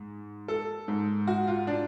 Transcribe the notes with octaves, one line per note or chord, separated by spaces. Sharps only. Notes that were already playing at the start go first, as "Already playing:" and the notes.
Already playing: G#2
A4
G#2
F#4
F4
D4